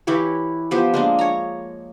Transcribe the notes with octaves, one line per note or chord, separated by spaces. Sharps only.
E3 E4 G4 C#5
F3 B3 G4 C5
G#3 A#3 D4
C#5 A#5